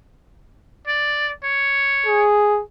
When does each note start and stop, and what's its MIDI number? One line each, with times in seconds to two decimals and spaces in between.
0.87 1.32 74
1.44 2.25 73
2.07 2.62 68